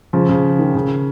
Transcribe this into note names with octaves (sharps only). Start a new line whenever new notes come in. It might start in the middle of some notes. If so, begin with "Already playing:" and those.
C#3 F3
C#3
D#3
C#3